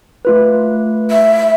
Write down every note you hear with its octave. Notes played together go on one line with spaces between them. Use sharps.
A3 F4 B4
E5